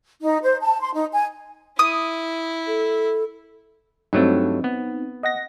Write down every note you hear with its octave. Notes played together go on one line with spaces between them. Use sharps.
D#4
C5
A5
C6
D#4
G#5
E4 D#6
A4
G2 F#3 A3 C4 D#4
B3
D#5 F#5 A#6